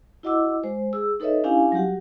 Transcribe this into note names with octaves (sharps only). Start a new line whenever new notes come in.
E4 F#4 D#5 F#5 D6 E6
G#3 C5
G#4 E6
D#4 A4 B4 C#5 D#5 E5
C#4 D4 E4 G4 F5 G#5
F#3 G3 F#4 G4 F#5